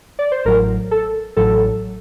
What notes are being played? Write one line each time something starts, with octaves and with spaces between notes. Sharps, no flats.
D5
C5
A1 A2 F#3 A#4
A4
A1 A2 F#3 A4